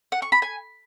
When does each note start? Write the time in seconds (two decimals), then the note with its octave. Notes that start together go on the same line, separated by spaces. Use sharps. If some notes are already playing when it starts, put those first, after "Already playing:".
0.12 F#5
0.22 C#6
0.32 B5
0.42 G#5